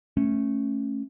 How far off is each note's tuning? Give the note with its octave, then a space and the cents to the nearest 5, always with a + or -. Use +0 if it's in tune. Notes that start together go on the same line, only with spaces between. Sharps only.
A3 +0 C#4 -10